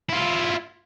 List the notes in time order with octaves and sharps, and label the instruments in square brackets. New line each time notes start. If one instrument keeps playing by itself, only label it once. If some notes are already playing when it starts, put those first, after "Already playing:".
[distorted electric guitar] E4 F4